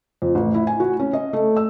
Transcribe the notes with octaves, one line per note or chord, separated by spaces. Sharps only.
F2
A1
E4
G#5
F#4
C#4
D#5
A3
E6